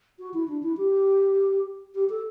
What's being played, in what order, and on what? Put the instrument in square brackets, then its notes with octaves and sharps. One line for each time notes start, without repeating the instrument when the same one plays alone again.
[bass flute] F#4
E4
D4
E4
G4
G4
A4